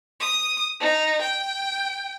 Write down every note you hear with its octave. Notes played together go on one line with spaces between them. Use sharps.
D#6
D#4
G5